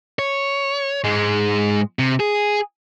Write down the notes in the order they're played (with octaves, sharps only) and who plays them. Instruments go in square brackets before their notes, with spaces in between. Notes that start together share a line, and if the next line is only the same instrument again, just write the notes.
[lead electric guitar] C#5
G#2 G#3
C3
G#4